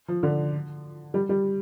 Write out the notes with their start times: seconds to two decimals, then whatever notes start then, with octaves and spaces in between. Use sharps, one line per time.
0.08 F3
0.23 D3
1.14 G3
1.29 G3